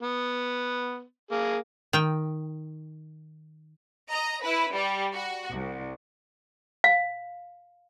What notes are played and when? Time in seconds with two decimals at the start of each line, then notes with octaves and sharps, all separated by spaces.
0.03 B3
1.31 A#3 G#4
1.93 D#3 G5
4.11 D#5 A#5
4.43 E4 B4
4.74 G3
5.14 F#4
5.49 C2
6.84 F5